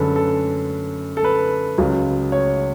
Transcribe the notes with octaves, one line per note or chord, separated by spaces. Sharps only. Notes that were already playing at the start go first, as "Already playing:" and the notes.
Already playing: F#2 D3 G#3 A4 B4
A4
A4
B4
C#2 C#3 F#3
C#5